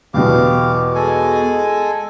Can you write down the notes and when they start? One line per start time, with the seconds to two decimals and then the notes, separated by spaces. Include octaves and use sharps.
0.14 E2 B2 G4 F5 D6
0.95 G#3 A4 G#5